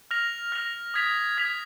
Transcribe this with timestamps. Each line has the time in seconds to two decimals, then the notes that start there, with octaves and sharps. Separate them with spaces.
0.11 F6 A#6 F7
0.52 F6 A#6 F7
0.94 D#6 G#6 B6 F7
1.37 D#6 G#6 B6 F7